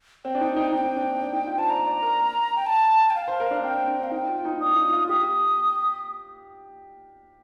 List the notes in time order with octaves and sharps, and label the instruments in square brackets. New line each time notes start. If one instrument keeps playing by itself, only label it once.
[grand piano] C4 [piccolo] G5
[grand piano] D4
D#4
D#4
[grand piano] D#4 [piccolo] G5
[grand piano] C4
D4
D4
D4
D#4
F4
[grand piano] C5 [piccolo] A5
[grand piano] D5 [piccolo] A#5
[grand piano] D5
A#4
[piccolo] G5
A5
G5
F5
[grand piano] C5
A#4
D4
[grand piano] C4 [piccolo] G5
[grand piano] C4
D4
[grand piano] C4 [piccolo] F5
[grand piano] D#4 [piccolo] G5
[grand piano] F4
D#4
[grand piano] D4 [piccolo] D#6
[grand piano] F4
D#4
F4
[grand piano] G4 [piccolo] D#6